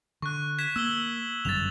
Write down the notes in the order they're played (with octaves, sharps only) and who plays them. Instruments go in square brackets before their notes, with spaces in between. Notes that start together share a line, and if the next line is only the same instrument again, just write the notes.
[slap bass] D3 [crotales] C#6 F#6
[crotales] G#6 B6 E7
[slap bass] A#3 [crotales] E6 G#6 G7
[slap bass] G1 F#2 G3 [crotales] A6 F7